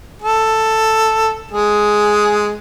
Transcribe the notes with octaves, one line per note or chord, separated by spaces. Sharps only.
A4
G#3 G#4